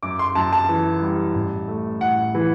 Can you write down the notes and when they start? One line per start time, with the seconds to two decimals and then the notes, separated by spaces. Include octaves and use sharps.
0.03 F#2 D6
0.19 C6
0.35 F#2 A5
0.53 A5
0.69 E3
1.02 G3
1.35 A1
1.68 A3
2.01 A2 F#5
2.35 E3